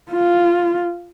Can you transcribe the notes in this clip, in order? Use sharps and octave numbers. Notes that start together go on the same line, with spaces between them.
F4